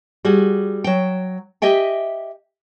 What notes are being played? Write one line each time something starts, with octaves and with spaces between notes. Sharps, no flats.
G3 F#4 G#4
F#3 G5
G4 D#5 E5 G5 G#5